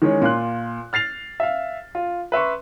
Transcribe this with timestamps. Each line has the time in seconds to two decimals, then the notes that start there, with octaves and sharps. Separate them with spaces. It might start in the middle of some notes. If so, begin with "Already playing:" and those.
0.02 D#3 E3 G#3 C#4 C#5
0.22 A#2 F4 C6 F#6
0.93 F6 A6 C7 F7
1.40 E5 F5
1.95 F4
2.32 B4 E5 C6 C#6